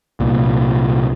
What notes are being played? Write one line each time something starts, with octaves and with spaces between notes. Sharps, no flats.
C2 A#2